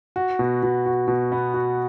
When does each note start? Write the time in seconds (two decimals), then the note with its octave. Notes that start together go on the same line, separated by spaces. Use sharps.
0.16 F#4
0.39 B2
0.63 B2
0.86 F#4
1.08 B2
1.32 B3
1.54 F#4